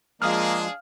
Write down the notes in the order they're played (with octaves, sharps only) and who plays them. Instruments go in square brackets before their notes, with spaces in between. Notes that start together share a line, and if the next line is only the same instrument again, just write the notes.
[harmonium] F3 G#3 [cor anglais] A#3 [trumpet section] D4 G#4 [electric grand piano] F5 D#6 F6